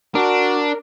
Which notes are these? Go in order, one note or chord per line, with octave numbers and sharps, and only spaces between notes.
D4 F#4 A#4